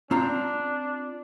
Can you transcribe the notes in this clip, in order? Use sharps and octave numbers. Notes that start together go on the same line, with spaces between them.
C4 D4 F4 A#5